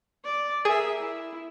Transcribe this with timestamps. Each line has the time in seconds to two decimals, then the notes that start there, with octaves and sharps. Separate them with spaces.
0.24 D5
0.65 G#4 A#4 E5
1.00 E4